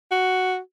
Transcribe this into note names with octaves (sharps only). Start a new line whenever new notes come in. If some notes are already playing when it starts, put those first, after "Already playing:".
F#4